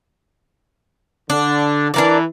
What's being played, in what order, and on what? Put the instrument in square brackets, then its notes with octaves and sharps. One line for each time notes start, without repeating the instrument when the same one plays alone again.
[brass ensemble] D3 [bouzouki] D4
[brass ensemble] E3 [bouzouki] D4 A#4 D5